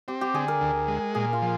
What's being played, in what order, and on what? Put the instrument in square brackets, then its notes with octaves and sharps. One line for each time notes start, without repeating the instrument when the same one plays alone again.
[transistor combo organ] C4 [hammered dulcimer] G4
[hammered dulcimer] G4
[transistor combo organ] D3 [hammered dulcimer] G#4
[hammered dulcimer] A#4
[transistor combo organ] D2
G#3
[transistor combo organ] A#2 [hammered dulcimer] G#4
[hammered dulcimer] F4
[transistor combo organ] F3